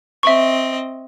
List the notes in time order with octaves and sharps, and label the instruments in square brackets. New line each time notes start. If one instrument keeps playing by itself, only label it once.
[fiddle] C4 D#5 [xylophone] E5 C#6